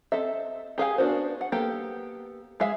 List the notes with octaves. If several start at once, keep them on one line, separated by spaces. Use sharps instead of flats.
C4 A4 D#5 E5
G4 G#4 F5 G#5
B3 D4 F#4 A#4 C5
F#5
A#3 B3 G4 A4 G5
G#3 G#4 E5 F5